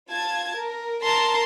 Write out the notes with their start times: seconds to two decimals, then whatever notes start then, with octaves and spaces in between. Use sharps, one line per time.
0.11 F4 A5 G#6
0.55 A#4
1.03 A#4 A5 A#5 C6